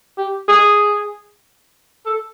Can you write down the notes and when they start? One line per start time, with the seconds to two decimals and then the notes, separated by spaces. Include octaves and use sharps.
0.17 G4
0.48 G#4
2.06 A4